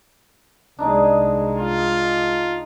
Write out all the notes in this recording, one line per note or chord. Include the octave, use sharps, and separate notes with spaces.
C2 G#3 D4 D#4 G#4
F4